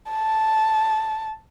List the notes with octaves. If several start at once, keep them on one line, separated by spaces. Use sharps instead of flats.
A5